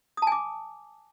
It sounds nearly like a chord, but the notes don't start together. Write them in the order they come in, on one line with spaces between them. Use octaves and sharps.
D#6 A5 G#5 D6